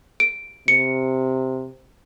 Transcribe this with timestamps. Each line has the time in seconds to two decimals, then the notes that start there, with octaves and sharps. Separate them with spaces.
0.20 D7
0.68 C3 C#7